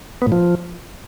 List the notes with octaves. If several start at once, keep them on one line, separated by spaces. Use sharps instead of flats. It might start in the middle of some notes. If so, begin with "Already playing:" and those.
B3
A2
F3